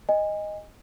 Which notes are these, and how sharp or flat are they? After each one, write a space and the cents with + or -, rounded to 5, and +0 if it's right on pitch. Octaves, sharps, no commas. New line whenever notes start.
D#5 +0 G#5 -25